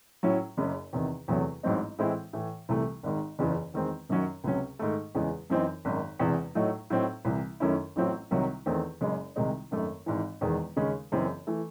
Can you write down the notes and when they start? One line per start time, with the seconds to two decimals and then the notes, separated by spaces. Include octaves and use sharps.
0.23 A2 F#3 C#4 E4
0.57 F#1 F#2 C#3
0.93 E2 C3 D#3
1.28 E2 C3 F#3 A3
1.63 A1 G#2 F#3 C4 D#4
1.98 A2 E3 G#3 C4 E4
2.33 A2 E3 A3
2.69 C2 C3 E3 A3
3.03 G#1 G#2 D#3
3.39 F#1 E2 C#3 E3
3.74 E2 D#3 G#3 C4
4.09 F#2 D#3 F#3 C#4
4.44 C#2 C3 F#3 C#4
4.79 G#2 D#3 A3
5.15 E2 C#3 E3 G#3
5.50 F#2 E3 C4 D#4
5.85 G#1 F#2 D#3
6.19 E1 E2 C3 E3
6.55 A2 F#3 A3 D#4
6.90 A2 F#3 C4 D#4
7.25 C2 C3 E3
7.60 F#2 D#3 A3 C#4 E4
7.96 A1 A2 F#3 C4 E4
8.31 C2 C3 D#3 F#3
8.66 E2 D#3 A3 C4
9.01 F#1 F#2 C#3 G#3
9.36 C2 C3 D#3 G#3 D#4
9.71 G#1 F#2 D#3 A3
10.06 G#1 G#2 E3
10.41 E1 E2 D#3 G#3
10.77 D#2 C#3 G#3 C#4
11.12 F#1 F#2 C#3 E3 C4
11.47 E3 A3